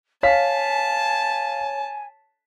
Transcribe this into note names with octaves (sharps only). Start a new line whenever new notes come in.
C#5 F5 G#5 A5 B6